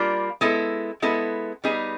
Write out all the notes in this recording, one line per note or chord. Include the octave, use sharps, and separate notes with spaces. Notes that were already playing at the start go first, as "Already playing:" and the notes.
Already playing: G3 A#3 D4 F4
G#3 B3 E4 A4
G#3 B3 E4 A4
G3 B3 D#4 G#4